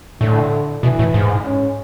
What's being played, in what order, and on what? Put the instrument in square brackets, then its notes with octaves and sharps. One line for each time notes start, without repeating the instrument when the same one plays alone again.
[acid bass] A2 [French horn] D3
[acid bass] B2 [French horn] E3
[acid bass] A2
[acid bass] G#2 [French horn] G#3
[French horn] C#4